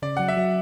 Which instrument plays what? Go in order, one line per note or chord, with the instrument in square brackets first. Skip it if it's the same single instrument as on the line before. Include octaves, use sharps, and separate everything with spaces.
[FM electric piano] C#3 [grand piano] D5
[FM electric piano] F#3 [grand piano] F#5
[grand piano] E5
[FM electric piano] F#3